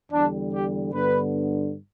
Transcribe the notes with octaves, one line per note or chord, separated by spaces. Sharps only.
E2 D3 G3 D4
G4
G2 D3 B3 B4